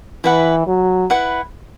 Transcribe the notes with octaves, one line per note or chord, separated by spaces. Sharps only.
E3 E4 B4 F#5
F#3
E4 B4 F#5